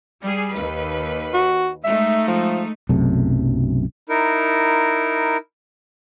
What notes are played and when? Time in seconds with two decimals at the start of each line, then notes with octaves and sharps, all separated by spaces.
0.23 G3 G#4
0.54 D#2 B4
1.34 F#4
1.84 G#3 A3 D#4 E5
2.28 F3
2.89 B1 F#2 C3 A3
4.09 D#4 E4 A#4